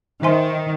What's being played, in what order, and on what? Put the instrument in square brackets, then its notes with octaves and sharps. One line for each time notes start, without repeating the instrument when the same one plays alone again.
[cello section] D#3 [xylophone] C5 E5 G#5 C6